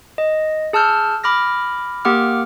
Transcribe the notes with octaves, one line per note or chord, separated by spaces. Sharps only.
D#5
G#4 A5 E6 F6 G6
B5 D6 F6 A#6
A#3 G4 F#5 D6 F6